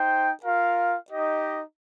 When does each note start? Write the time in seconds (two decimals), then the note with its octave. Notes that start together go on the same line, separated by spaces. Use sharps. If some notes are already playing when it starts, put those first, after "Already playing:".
Already playing: D#4 C5 G5
0.43 F4 A#4 F5
1.08 D#4 G4 D#5